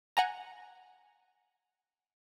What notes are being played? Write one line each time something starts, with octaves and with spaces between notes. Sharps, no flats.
F#5 G#5 A#5